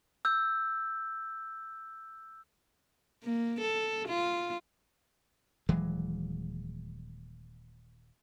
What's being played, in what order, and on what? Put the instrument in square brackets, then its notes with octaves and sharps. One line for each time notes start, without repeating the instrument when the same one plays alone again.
[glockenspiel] E6 G6
[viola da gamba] A#3
A4
F4
[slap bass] D#1 E3 F#3 G#3